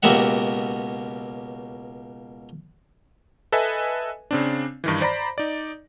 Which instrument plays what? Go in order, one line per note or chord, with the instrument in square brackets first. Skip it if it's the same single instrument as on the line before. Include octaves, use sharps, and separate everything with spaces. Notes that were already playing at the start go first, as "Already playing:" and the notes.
[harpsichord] C#2 B2 A#3 G4 E5 F#5
[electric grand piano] A4 B4 D#5 E5 G#5
C#3 C4 D4
G2 D#3 E3
C5 D5 A#5 B5 A#6
D#4 D5